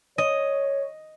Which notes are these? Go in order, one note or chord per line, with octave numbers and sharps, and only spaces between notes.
C#5 D#5